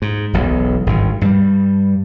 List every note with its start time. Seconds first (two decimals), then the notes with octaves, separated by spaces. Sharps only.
0.02 G#2
0.33 E1 B1 E2
0.86 G#1 G2
1.21 G2 G3